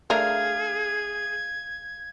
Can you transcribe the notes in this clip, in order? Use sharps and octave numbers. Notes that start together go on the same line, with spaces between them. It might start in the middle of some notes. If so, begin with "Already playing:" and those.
A3 D4 G#4 A#4 F5 G#6